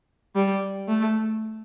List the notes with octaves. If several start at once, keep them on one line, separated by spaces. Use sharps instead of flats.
G3
A3